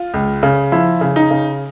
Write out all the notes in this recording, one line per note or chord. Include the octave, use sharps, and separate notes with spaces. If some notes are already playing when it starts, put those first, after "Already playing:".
Already playing: F4
C#2
C#3
F3 E4
C#3
D#4
C#3